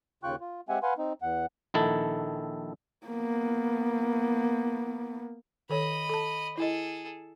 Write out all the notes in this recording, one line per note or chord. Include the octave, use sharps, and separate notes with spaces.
D#2 C#3 F4 G5 C#6 F#6
F4
G#3 C4 G4 E5 F#5 G#5
B4 F5 F#5 G#5 C6
C4 D#4
E2 F#5
A#1 D#3 E4 A4
A#3 B3
D#3 A4 C#5 D#5 B5
A4 A5
E4 G#4 A4 D#5